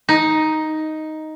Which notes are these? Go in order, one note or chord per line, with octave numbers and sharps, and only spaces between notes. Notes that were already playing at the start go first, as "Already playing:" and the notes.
D#4